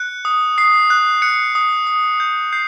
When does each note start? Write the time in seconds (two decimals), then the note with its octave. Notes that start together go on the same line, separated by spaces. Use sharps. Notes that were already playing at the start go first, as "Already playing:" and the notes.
Already playing: F#6 C#7
0.25 D#6
0.58 D#6 C7
0.90 F#6
1.22 F#6 C#7
1.55 D#6
1.87 D#6
2.20 G6
2.53 G6 C7